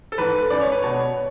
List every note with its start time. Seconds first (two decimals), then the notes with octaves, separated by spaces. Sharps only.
0.12 A4
0.18 G#2 E3 B4
0.50 C#2 D5
0.61 C#5
0.72 B4
0.82 B2 C#5